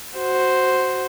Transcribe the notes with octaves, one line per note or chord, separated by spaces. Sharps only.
F#4 C5